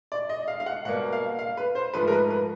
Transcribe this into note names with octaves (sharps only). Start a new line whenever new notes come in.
D5
D#5
F5
F5
F#5
B2 G3 A#3 F#5
F5
F5
B4
C5
G#2 F3 A3 B4
A#4
B4
B4